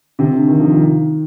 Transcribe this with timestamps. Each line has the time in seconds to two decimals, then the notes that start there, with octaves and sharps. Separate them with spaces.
0.19 C3
0.34 D3
0.48 D#3
0.60 F3
0.72 D#3